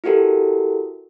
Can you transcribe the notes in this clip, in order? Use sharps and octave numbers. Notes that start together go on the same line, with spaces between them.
E4 F#4 G4 A4 A#4